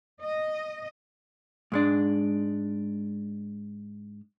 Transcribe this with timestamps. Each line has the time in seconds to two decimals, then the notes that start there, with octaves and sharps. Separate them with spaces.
0.22 D#5
1.72 G#2 G#3 D4